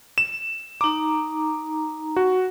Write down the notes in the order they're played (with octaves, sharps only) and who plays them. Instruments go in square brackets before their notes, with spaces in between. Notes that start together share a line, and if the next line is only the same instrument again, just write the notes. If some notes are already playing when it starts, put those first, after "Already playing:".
[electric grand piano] E7
[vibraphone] D#4 A#5 [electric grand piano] D6
[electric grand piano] F#4